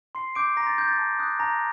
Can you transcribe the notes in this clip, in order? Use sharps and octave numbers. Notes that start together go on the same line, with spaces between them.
C6 C7
D6 G6 D7
A#5 C6 A#6
A6
G6
A6
A5
D#6 F#6
A5 A#5 A#6